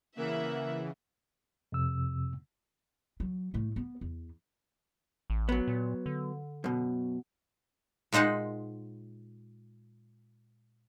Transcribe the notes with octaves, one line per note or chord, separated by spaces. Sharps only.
C#3 E3 A#3 E5 F#5
F2 C3 E6
F#3
A2 A3
B3
E2
A1
F#3 B3
A#2
D3
F#2 B2
A#2 G#3 D#4 C5 F#5